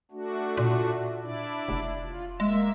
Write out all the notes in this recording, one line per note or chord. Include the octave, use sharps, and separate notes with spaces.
A3 D4 F#4
A#2
D4 E4 D5
F1
F4
G#3 A#3 E5 E6